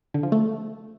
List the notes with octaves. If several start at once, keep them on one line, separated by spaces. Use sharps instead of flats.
D3
F3
A3